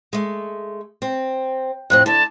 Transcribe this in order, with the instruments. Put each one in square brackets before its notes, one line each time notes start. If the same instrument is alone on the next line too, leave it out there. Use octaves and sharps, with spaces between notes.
[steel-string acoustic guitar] G#3 A3
C4
[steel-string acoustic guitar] F2 A2 C4 [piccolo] F#6
[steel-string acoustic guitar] D3 A3 [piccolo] A5